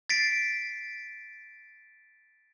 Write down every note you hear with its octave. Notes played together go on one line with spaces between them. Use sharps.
A6 B6 C7 D7